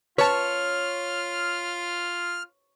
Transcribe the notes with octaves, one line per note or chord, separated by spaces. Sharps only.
F4 B4 C#5 A5 F6